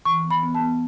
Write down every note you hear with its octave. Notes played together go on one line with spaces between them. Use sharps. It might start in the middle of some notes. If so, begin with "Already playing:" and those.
E3 C#6
B3
B5
B3
A5
B3